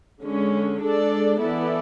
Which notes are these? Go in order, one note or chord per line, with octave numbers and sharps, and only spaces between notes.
D3 G#3 C#4
G#3 D4 A4 D5
E3 B3 E4 A4 D5